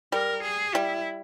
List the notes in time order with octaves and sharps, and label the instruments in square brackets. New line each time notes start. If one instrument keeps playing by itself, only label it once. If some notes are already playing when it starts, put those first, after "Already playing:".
[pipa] G3 [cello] A#4
[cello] G#4
[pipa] G3 [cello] E4